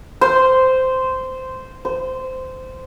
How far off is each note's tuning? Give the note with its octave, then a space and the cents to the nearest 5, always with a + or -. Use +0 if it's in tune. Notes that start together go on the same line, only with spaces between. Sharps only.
C5 -10
C5 -15